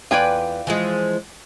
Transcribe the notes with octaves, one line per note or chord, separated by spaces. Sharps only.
E2 F4 B4 D5 G5 G#5
E3 F3 G#3